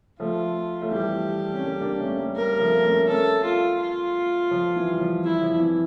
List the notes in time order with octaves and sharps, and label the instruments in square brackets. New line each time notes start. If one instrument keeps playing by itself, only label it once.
[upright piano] F3 A3 [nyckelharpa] F4
[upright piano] A3
[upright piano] E3 G3 [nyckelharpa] G4
[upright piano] C#4
G3 A#3
A#3 D4
A3 C#4
G3 A#3
[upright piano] G3 A#3 [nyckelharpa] A#4
[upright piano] F3 A3
A#3
A3 C#4
[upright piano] A3 C#4 [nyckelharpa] A4
[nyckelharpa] F4
F4
[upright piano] F3
E3
G3
F3
[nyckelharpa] E4
[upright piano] F3
E3